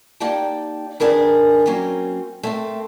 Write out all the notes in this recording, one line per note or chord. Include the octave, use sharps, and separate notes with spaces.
A#3 D#4 G4 D5 G5 A5
D#3 D4 G#4 A#4 B4
F#3 A#3 C4 C#4
A3 A#3 C4